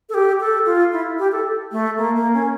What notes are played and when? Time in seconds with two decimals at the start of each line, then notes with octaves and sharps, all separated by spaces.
0.09 A4
0.14 G4
0.40 A4
0.66 F4
0.93 E4
1.19 G4
1.32 A4
1.72 A3
1.97 A#3
2.15 A#3
2.33 C#4